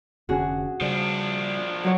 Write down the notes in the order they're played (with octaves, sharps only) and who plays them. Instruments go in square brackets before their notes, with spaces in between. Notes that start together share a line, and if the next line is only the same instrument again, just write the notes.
[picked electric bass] F1 D3 C#4 [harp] F#4 G#4
[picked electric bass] C#3 G3 [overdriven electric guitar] F3 D4
[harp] F#3 C#5